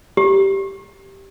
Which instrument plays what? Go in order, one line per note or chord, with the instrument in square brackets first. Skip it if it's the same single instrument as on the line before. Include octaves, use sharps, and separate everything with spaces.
[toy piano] G4